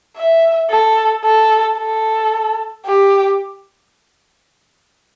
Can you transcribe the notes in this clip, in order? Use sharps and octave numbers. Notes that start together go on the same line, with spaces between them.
E5
A4
A4
A4
G4